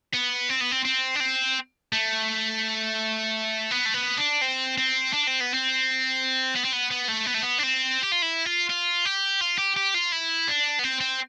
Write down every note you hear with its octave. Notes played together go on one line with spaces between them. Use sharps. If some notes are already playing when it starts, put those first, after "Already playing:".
B3
C4
B3
C4
C4
D4
C4
A3
B3
A3
B3
D4
C4
C4
D4
C4
B3
C4
B3
C4
B3
B3
A3
B3
A3
B3
D4
C4
G4
F4
E4
F4
F4
G4
F4
G4
G4
F4
E4
D4
B3
C4
C4